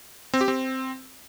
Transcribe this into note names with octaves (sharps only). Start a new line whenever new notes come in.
C4
G4
C4